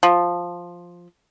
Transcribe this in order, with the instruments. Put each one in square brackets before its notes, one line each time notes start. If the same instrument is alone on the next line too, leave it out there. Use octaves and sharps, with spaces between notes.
[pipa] F3